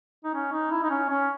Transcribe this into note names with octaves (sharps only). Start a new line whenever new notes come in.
D#4
C#4
D#4
E4
D#4
C#4
C#4